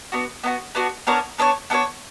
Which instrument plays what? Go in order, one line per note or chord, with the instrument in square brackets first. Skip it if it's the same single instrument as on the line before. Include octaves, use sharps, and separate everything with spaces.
[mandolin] B3 D4 F#4
B3 D4 F#4
B3 D4 F#4
B3 D4 A#4 C#5
B3 D4 A#4 C#5
B3 D4 A#4 C#5